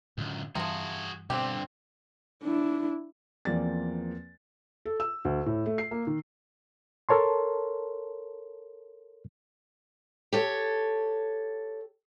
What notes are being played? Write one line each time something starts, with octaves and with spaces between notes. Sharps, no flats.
C#2 F#2 A2 D3
G2 C3 E3 F3 G3 F#4 G#4
G2 B2 D3 C4 G4
D4 E4
E2 F3 A#3 C4 D5 A6
A4
E6
D2
A2
A3
C7
A#3
D#3
A4 A#4 C#5 A5 C6
G4 A4 C#5